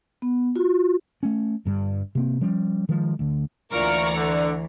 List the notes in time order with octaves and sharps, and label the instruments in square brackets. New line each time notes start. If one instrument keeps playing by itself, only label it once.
[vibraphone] B3
F4 F#4
[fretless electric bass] A3 C#4
G1 G2 G3
C3 A#3 C4
F3 G3 C#4
D#3 F3 G#3
D2 D3
[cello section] D2 E3 [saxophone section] A#2 F4 A#4 [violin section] D5 A#5 C#6
[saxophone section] D3